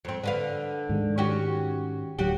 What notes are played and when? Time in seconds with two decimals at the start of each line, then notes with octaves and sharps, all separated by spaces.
0.05 F2 C4
0.24 D3 B4 F5
0.89 G#2 D#3 G#3
1.18 C#4 F#4 G4
2.19 D1 D2 F#3 F#4 G4